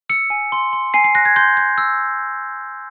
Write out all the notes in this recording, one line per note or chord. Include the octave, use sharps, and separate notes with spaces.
E6 C#7
G#5
C6
C6
G#5 C7
C7
F#6 A#6
G#6
C6 G6
G6
E6